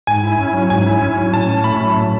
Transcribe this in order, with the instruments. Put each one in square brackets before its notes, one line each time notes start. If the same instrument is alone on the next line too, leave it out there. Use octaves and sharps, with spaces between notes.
[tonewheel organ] G#2 [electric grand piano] G#5
[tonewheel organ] E4
C#4
F#3
[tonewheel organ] G#2 [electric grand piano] G#5
[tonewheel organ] E4
C#4
F#3
[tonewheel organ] A2 [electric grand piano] A5
[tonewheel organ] C#4
[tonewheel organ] A3 [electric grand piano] B5
[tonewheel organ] F#3
A2